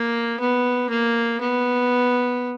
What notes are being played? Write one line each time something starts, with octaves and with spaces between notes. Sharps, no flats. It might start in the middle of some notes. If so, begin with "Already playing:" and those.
Already playing: A#3
B3
A#3
B3